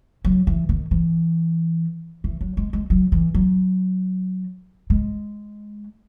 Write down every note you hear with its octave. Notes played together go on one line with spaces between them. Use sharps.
F#3
E3
D#3
E3
E3
F#3
G#3
G#3
F#3
E3
F#3
G#3